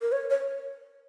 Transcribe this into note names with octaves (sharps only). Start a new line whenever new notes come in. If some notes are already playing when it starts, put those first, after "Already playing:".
A#4
C#5
C#5